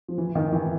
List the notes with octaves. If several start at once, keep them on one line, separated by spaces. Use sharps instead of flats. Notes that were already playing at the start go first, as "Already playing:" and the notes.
F3
E3
D#3
E3